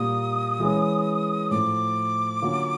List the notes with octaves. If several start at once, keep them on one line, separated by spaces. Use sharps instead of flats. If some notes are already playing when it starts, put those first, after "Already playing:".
Already playing: A#2 G3 A#3 D#6
E3 G#3 C#4
A2 F3 A3 D6
D3 F#3 A#3 C#4 F4